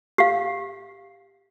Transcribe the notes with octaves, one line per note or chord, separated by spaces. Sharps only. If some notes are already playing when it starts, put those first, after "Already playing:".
G4 F5